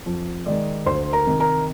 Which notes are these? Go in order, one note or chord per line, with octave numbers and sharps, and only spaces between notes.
F2
D#3 G#3 D5
D2 C5 C6
A#4 A#5
C3 D#3
A#4 A#5